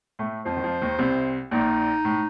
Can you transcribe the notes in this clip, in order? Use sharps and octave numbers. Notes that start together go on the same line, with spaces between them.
A2 A3
F2 F3 C5
D#3
F2 F3
D#2 D#3
C2 C3
A#1 A#2 D#4
A2